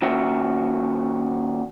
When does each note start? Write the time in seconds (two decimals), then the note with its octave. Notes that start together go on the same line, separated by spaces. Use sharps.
0.02 A#2 D#3 C#4 F#4 C#5 E5